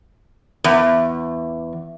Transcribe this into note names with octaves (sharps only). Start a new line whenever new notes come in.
E2